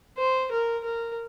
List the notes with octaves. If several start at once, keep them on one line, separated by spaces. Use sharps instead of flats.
C5
A#4
A#4